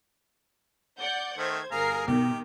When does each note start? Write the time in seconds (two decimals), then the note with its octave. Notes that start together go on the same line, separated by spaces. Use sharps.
1.00 D5 F#5 G6
1.38 D#3 A3 C5 G#6
1.71 G1 G#4 A#4 F5 A#5 C7
2.08 B2 D#3 G4